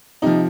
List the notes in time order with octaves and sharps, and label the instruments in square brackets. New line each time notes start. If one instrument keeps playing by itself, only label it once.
[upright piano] C3 F3 D#4